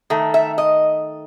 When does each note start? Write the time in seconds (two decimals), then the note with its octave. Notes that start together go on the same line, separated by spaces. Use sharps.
0.10 D#3 A3
0.34 E5
0.58 D#5